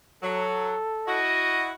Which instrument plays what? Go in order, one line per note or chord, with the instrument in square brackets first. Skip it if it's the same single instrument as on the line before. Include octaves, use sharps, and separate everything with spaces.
[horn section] F#3 [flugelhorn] A4
[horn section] E4 F#4 [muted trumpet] D#5